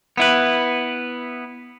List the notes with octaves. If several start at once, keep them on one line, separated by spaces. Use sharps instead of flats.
B3 E4 B4